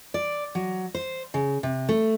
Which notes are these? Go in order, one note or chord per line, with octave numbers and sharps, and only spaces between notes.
D5
F#3
C5
C#3
C3
A3